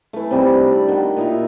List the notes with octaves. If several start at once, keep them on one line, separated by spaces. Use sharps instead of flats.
E3 A3
C3 G3 D#4
D4
D5
D#3 F#4
A#2 D#4 E4 E5